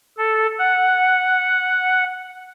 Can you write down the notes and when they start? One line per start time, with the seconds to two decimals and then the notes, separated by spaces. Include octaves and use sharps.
0.18 A4
0.59 F#5